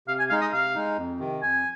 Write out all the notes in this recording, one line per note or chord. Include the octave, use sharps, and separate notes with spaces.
C3 F5
G#5
G#3 D#4 F5
D#5
C3 F5
G#3 D#4
F2
C3 D#3
F2 G#5